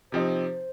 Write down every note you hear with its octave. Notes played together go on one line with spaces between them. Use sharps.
C3 F3 C4 D#4 C5